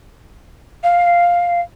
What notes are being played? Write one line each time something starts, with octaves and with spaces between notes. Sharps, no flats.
F5